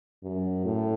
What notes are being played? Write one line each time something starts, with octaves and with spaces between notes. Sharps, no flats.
F#2
A2